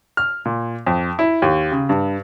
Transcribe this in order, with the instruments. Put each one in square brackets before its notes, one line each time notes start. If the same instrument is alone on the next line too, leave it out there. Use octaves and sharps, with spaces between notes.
[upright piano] F6
A#2
F2
E4
D#2
C#3
G2